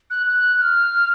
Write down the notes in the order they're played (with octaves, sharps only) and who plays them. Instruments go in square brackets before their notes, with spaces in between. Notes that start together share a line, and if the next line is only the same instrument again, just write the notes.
[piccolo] F#6
F#6
F#6
F6